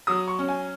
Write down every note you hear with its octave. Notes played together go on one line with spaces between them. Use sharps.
F#3 D#6
C#6
C#4
G#5